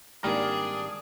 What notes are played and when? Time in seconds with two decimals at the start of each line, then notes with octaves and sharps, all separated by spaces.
0.23 G#1 G3 A#3 D4 G#4 A#5 D#6 F6